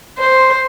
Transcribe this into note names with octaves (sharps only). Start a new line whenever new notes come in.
C5